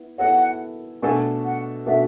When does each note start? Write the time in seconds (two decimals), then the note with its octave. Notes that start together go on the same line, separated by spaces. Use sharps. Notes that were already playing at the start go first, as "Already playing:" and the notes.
Already playing: B3 E4
0.18 B3 E4 A4 C#5 F#5
1.02 B2 A3 D4 F#4 A4 G#5
1.45 F#5
1.86 B2 A3 D4 F#4 A4 E5